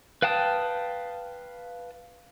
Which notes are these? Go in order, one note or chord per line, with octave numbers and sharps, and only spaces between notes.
B4 F5 G5 A5 D#6